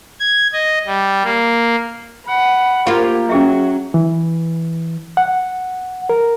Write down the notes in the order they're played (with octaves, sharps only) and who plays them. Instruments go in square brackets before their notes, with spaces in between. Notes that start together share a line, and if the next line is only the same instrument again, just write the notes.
[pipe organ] G#6
D#5
G3
A#3
[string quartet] F#5 B5
[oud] A#3 F4 [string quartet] G4
[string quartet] F#3 [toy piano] C#4 G#4 E5
[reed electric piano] E3
F#5
A#4